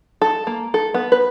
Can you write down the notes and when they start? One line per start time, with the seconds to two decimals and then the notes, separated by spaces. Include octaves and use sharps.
0.21 A4
0.47 A#3
0.74 A4
0.94 B3
1.12 B4